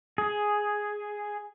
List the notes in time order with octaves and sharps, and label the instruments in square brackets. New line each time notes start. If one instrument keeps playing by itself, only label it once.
[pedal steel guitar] G#4